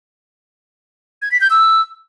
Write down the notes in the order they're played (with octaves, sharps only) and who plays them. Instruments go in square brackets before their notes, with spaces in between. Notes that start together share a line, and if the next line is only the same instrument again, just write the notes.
[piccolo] G#6
B6
G6
E6